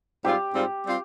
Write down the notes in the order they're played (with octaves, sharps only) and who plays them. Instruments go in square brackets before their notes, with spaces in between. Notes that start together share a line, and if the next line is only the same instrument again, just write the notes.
[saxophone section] G#2 G3 C4 F4 [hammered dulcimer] G4
[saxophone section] G#2 G3 C4 F4
G3 C4 F4